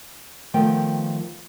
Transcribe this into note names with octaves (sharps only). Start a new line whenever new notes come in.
D#3 F3 A3 B3 G5